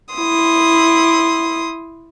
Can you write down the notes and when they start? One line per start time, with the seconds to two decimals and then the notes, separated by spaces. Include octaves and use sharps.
0.13 E4 C6 D#6